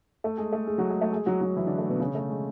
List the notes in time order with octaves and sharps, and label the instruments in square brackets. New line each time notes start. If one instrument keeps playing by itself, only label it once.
[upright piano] A3 A4
G#3 G#4
A3 A4
G#3 G#4
F#3 F#4
G#3 G#4
A3 A4
G#3 G#4
F#3 F#4
F#3 F#4
E3 E4
D3 D4
A3
B2 B3
C#3 C#4
A3
G#3